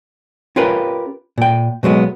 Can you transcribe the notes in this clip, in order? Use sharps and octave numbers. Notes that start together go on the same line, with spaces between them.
C#4 F4 G4 A#4 B4
A#2 G5
B2 F#3 G#3 B3